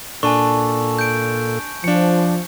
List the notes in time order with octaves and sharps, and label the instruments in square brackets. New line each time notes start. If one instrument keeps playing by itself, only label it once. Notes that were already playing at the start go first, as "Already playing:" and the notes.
[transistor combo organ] A#2 A4 [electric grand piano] D4 [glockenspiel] G#5 A5 C#6
[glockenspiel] G6 D7
[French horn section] F3 [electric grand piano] D4 C#7